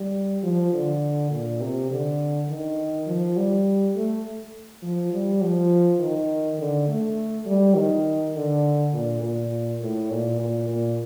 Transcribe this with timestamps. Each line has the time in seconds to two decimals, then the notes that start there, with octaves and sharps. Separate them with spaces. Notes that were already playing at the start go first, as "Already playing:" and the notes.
Already playing: G3
0.43 F3
0.73 D3
1.31 A#2
1.61 C3
1.90 D3
2.49 D#3
3.07 F3
3.37 G3
3.95 A3
4.83 F3
5.13 G3
5.42 F3
6.00 D#3
6.59 D3
6.88 A3
7.46 G3
7.76 D#3
8.34 D3
8.93 A#2
9.22 A#2
9.81 A2
10.10 A#2
10.40 A#2
10.69 A#2